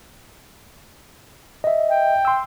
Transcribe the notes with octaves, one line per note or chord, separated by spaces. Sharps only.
D#5 E5
G5
C6 E6